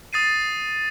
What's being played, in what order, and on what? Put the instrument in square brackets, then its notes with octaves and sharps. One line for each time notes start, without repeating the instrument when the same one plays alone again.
[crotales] D#6 A6 C7 D#7